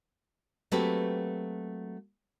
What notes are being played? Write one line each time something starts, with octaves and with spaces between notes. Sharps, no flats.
F#3 A3 A#3 C4 G4 B4